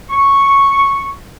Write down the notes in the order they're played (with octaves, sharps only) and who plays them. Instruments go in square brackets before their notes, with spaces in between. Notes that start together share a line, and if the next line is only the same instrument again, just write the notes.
[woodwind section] C#6